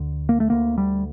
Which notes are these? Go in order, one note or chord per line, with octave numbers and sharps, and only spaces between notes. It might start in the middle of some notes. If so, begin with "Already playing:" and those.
Already playing: D2 D3
A#3
A3
D2 D3 A#3
G3